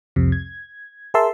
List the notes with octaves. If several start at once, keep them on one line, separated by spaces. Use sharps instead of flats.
C2 F2 C3
G#6
G#4 A#4 E5 A5 C6 E6